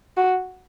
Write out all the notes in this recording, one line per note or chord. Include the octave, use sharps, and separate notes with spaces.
F#4